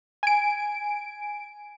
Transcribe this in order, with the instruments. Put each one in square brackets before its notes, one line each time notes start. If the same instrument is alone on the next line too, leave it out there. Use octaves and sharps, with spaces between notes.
[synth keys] G#5 D7